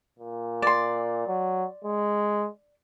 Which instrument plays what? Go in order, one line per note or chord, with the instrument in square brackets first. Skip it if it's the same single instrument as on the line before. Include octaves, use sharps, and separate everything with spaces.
[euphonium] A#2
[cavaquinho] D5 C6
[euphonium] F#3
G#3